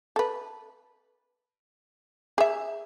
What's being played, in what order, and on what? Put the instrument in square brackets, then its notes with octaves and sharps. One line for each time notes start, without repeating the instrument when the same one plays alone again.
[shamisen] A4 B4
G#4 E5